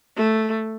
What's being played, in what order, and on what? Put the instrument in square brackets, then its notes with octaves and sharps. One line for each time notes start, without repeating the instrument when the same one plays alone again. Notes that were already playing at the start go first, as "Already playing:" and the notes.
[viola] A3